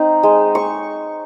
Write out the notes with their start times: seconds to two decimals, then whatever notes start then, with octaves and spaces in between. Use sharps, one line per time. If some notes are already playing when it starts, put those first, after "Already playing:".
Already playing: C4 D#4
0.23 G#3
0.55 C#6